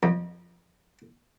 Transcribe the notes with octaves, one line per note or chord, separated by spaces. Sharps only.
F2